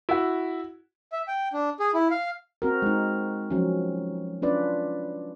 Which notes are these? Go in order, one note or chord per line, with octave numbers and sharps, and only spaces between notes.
E4 F#4
E5
G5
D4
G#4
E4
F5
C4 F#4 A#4
G#3 D#4
F3 F#3 C#4
C#4 D4 F4 B4 D5